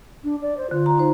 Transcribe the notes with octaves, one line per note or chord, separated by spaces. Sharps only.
D4
D5
C5
D3 F4
A#5
D#4 C5